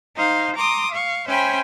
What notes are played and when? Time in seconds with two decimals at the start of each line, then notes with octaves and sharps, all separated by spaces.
0.15 D#4 C5 F5
0.56 A#5 C6 D6 D#6
0.91 F5 C#6
1.27 C#4 C5 E5 G5 G#5 B5